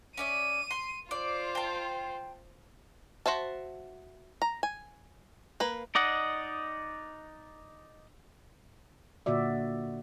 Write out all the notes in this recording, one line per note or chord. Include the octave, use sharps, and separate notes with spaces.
C#4 D5 E5 D#7
C6
F4 C5 D5
G5 A5
F#4 C5 E5 A5
A#5
G#5
A#3 B4
D#4 D5 D#5 F#5
A#2 D3 F#4 D5 E5